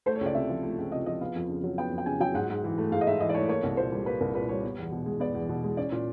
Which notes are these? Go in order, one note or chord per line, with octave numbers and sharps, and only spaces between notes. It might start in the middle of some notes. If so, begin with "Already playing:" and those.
A3 C5
C#5
C#2
D5
C3 E5
F3
A3
C#2
C3 D#5
F3 D#5
B3 F5
F2
C#3
F#3
B3 G5
F2
G5
C#3 G#5
F#3 G5
G#2 F#5
G#2
E3
A3
G#2 F5
D#5
G#2 E5
E3 D#5
D5
A3 C#5
A#3 C#5
C2
A#2 C5
G3
A#3 B4
C2 A#4
A#2 B4
G3 C#5
B3
E2
B2
G#3
B3 D5
E2
B2
G#3
C#4 D5
A#2